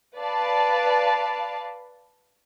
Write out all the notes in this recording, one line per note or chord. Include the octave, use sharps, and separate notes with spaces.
B4 D5 F5 A5